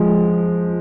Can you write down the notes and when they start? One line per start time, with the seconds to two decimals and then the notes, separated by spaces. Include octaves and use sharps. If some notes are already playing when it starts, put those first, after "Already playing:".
Already playing: F3 G#3